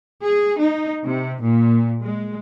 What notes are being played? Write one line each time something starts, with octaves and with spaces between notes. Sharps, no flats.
G#4
D#4
C3
A#2
G#3